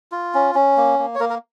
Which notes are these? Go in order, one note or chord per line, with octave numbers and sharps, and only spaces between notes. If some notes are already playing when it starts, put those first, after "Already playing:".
F4
C#4
C#4
A#3
A#3
C#5
A#3 A#4
A#4